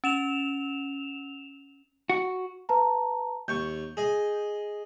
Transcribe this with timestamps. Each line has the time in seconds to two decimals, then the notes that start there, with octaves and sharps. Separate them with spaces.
0.04 C#4 E7 F7
2.09 F#4
2.69 B4 A5 A#5
3.48 D#2 C#6 G6
3.97 G#4 D#5